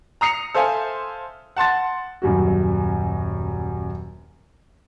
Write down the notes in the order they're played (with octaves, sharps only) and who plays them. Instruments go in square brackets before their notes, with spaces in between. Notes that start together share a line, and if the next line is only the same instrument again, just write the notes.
[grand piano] A#5 D#6 C7 C#7 F7
A4 C5 E5 F5 G#5
F#5 A5 C6 A6
D#1 F#2 G3 F#4